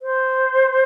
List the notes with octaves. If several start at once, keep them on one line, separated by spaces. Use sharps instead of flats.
C5